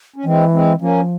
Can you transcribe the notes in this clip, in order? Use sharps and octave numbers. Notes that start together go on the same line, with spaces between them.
C#4
E3 G#3 C4
G#3 C4
F3 A#3 C#4